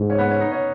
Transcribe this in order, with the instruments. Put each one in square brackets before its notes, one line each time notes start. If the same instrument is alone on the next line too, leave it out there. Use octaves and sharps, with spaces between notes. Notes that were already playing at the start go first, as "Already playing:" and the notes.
Already playing: [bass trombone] G#2
[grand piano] C#4
B3
C#4
D#4
C#4